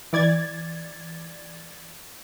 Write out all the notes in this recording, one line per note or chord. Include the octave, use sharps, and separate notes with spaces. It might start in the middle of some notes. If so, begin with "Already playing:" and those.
E3 D5 G#6 A6